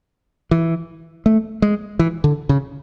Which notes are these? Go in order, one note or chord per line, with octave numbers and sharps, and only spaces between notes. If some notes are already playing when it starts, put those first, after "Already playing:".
E3
A3
G#3
E3
D3
C#3